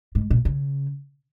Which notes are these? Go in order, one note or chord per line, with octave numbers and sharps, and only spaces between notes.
G#2
A#2
C#3